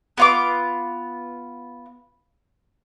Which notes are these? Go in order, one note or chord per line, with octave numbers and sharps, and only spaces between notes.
B3 F4 D6